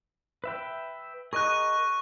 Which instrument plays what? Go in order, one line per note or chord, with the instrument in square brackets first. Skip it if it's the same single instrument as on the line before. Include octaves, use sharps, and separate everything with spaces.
[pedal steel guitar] B4 E5 G5
[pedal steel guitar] G#4 A#4 D#5 [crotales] C#6 F#6